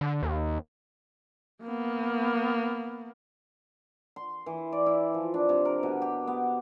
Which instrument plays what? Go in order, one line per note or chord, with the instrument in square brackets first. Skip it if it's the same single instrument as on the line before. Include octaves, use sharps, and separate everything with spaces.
[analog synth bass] D3
D#2
[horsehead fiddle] A#3 B3
[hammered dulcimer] C6
E3
D5
E4
F3
D4
C3
A#4
B2
G4
B3